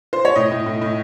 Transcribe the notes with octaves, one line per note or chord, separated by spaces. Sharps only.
C5
C#5
A2 D#5
A2
A2
A2